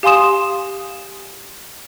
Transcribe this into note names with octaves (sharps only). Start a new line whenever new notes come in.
G4 F5 G#5 C6 D#6 E7